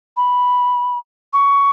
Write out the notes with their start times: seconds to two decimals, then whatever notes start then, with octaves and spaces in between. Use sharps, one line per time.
0.17 B5
1.33 C#6